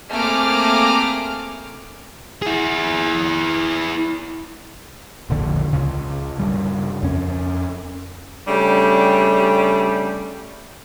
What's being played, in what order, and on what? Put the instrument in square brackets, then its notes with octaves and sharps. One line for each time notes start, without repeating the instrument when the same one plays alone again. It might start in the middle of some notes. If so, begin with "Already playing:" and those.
[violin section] A3 A#3 C4 G#4 D6 F6
[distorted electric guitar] E4 G#4
[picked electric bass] E1 A#1 D3
C#2 C#3
G2 C#3 G3
F2 C#4
[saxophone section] C#3 G3 A3 D4 G4 D5